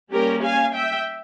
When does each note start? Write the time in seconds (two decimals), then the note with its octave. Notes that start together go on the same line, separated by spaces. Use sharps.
0.11 G3 A#3 C#4 G4 A#4
0.43 F5 G#5
0.74 E5 G5